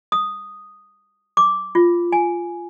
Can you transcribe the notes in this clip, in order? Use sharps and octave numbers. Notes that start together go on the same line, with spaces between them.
D#6
D6
F4
G#5